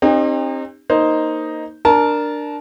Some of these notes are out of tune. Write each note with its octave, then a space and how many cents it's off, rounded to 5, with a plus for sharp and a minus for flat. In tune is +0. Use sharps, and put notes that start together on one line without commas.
C4 +30 D#4 -30 G4 +40
A#3 +0 D#4 +0 C5 +5
D4 +10 A#4 +0 A5 -20